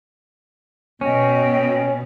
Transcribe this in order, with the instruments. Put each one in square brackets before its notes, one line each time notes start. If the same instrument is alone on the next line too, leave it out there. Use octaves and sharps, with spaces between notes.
[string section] B2 [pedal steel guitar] C#4 [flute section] D#5 G5